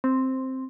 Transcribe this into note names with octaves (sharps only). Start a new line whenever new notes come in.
C4